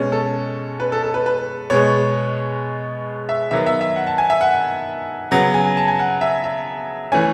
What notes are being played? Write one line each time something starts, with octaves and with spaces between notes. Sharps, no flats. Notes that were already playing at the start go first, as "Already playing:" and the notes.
Already playing: B2 G#3 C#4
A4
B4
A4
A4
B4
B4
B2 G#3 B3 C#5
E5
D#3 F#3 B3 E5
E5
E5
F#5
A5
G#5
E5
F#5
C#3 F#3 B3 F#5
G#5
A5
G#5
F#5
E5
E5
E3 A3 C#4 G#5